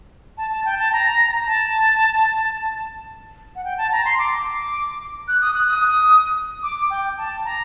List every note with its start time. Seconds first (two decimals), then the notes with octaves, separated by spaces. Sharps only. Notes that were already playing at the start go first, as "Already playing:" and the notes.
0.38 A5
0.51 A5
0.65 G5
0.79 A5
0.92 A#5
1.47 A5
3.56 F#5
3.65 G5
3.78 A5
3.92 A#5
4.05 C6
4.19 D6
5.28 F#6
5.42 D#6
5.54 F#6
5.68 D#6
6.63 D6
6.90 G5
7.18 A5
7.44 A#5